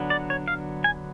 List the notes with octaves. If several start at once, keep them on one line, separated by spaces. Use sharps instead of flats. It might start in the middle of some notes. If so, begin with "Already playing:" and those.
Already playing: D3 F#3 B3 D4
D5
C#5
F5
G#5